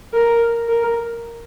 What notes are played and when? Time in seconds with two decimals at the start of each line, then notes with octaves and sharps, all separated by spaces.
0.13 A#4
0.68 A#4